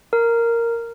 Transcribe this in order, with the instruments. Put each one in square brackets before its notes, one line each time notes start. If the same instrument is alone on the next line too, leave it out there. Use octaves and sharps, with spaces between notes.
[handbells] A#4